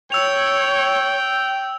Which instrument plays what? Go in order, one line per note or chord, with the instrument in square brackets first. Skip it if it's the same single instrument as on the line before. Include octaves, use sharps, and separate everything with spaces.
[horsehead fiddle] C#5 [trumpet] G5 [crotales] E6 F7